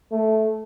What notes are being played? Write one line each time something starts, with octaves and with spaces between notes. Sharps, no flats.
A3